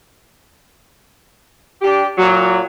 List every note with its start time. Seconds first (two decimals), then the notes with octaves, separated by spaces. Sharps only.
1.82 D4 G4
2.17 A#2 F#3